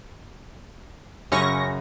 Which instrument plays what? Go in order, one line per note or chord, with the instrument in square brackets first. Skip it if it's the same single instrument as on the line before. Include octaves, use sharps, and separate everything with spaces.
[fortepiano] F#2 C#3 [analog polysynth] C#4 C#6 A#6